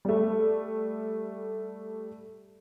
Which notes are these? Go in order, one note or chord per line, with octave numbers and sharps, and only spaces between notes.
G3 A3